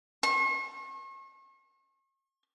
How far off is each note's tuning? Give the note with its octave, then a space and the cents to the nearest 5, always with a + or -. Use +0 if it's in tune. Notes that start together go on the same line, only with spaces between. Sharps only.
C#6 -45